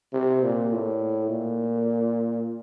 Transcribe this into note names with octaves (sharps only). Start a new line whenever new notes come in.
C3
A#2
A2
A#2